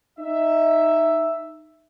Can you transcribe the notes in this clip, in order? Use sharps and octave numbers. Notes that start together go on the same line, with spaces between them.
D#4 E5